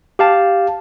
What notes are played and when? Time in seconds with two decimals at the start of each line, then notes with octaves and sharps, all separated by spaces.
0.19 G4 F5 A5